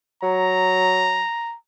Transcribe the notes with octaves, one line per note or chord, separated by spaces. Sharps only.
F#3 A#5